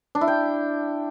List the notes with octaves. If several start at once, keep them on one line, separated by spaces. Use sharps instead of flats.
D4
E4
G5